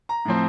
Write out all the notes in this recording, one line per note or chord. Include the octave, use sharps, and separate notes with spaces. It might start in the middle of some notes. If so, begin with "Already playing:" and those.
A#5
A2 F3 C4